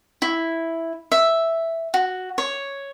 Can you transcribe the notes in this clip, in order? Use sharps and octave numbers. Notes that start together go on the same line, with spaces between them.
E4
E5
F#4
C#5